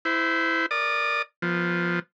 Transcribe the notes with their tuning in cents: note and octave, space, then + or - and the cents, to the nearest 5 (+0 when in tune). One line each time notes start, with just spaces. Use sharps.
E4 +0 C5 -30
A#4 +0 D5 +0 D#6 -30
F3 +0 B3 -15